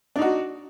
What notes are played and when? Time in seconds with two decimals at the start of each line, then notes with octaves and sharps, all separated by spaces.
0.16 D4
0.19 D#4
0.21 F#4